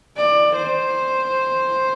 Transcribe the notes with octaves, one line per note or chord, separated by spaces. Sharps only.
D5
C5